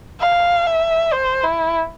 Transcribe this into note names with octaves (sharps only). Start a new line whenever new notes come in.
F5
E5
C5
E4